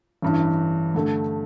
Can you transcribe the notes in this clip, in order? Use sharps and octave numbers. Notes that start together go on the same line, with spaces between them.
A1 G2 E3
G2 D3 A3